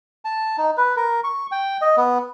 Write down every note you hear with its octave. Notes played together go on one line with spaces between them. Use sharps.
A5
D#4
B4
A#4
C#6
G5
D#5
B3